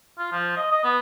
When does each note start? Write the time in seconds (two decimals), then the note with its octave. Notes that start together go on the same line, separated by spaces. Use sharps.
0.19 F4
0.32 F3
0.57 D#5
0.72 D#5
0.84 B3